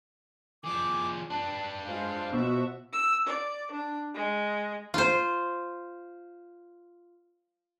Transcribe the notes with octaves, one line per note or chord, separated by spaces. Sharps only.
F3 G#4 D6
D4 B4 A5
G#3 F4 C5 F5
B2 F3 F#4 E5
E6
D5
D4
G#3
F4 C5